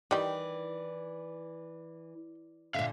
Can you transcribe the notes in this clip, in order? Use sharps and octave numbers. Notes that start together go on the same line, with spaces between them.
D#3 E3 G3 D5
A#2 D3 E5 F5